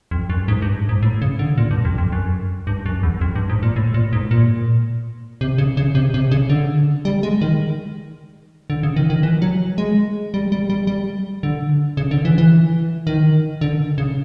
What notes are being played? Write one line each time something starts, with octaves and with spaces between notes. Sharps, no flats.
F2
F#2
G#2
G2
G#2
A2
C#3
D3
A#2
G2
F2
F2
F#2
G2
F#2
E2
F2
G2
G#2
A#2
A2
A#2
G#2
A#2
C3
C#3
C#3
C3
C3
C#3
D3
G3
G#3
D#3
D3
C#3
D#3
D#3
E3
F#3
G#3
G3
G3
G3
G3
D3
C#3
D3
E3
E3
D#3
D3
C#3